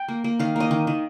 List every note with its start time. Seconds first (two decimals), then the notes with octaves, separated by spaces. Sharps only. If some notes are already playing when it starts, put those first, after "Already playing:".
Already playing: G5
0.08 A#3
0.24 A#3
0.39 D#3 F5
0.56 A#3 D#5
0.71 D#3
0.87 D#3